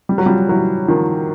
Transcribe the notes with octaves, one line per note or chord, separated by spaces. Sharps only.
G3
F#3
F3 G3
E3 F#3
D#3 F3